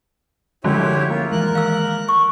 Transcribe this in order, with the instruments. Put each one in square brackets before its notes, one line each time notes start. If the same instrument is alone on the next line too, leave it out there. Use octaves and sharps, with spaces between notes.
[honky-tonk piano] F#2 D3 G#3 [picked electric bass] F3 [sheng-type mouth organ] E4 G4 C#5
[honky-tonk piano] A#3 [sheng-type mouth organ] F4
[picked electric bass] D#3 E3 G#3 [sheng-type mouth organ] A#4 F#6
[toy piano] F5 E6
C#6